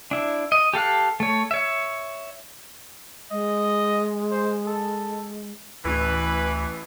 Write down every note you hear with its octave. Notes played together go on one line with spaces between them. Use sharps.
D4 E4
D#5
G4 A4 F5 F#6
A3 C#5
C#5 E5
G#3 D#5
C5
A4
A1 D2 A2 E3 B4